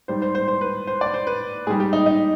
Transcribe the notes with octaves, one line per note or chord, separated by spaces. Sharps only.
G#2 G3 C5
C5
C5
C5
B4
C5
D5
C5
B4
G#2 G3 G#4
G4
D#4
D#4